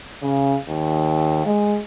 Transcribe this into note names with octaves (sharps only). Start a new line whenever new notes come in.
C#3
D#2
G#3